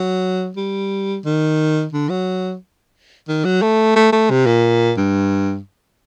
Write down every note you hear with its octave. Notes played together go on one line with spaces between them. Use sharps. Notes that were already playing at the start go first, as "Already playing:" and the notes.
Already playing: F#3
G3
D#3
D3
F#3
D#3
F#3
A3
A3
A3
C3
A#2
G2